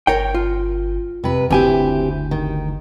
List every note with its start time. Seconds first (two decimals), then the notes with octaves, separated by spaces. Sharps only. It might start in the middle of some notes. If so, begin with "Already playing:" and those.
0.07 G1 A#4 C#5 G5
0.34 F4
1.24 F2 C3 B4
1.50 F#1 D2 C4 E4 G4 G#5
2.31 D#3